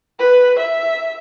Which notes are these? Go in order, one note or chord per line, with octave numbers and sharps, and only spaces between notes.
B4
E5